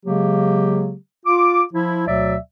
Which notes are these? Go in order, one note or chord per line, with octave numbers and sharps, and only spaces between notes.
C#3 F#3 G#3 A#3 G4
F4 D6
F3 E4
D2 B2 F#3 D5 E5